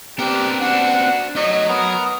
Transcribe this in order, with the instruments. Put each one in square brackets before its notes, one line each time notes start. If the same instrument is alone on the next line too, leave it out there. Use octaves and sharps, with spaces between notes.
[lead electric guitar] B3 C4 [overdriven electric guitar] D4 A#4 [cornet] G4
[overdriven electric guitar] D4 F#4 [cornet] F#5
[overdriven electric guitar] A3 D#4 [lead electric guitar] F#4 C#5 [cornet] D#5
[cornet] B3 [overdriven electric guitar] A#4 [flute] D#6